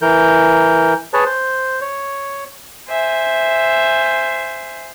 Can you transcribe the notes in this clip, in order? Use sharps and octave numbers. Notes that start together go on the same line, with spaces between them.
E3 A#4 G6
G#4 B4 C#5 A5
C5
C#5
C5 E5 G#5